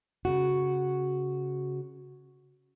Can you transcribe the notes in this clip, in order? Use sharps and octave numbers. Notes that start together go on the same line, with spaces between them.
C#3 F#4